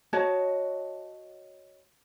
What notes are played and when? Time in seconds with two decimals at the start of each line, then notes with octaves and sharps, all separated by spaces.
0.13 F#4 C#5 D#5 A5